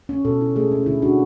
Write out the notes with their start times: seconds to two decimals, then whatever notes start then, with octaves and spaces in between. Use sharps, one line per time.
0.09 C#4
0.25 B2 A4
0.41 E4
0.56 A3 G#4
0.71 C#4
0.86 D3 E4
1.02 D4 F#4